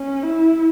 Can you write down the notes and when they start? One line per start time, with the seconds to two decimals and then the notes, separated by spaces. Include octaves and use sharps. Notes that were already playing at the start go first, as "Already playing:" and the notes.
Already playing: C#4
0.23 E4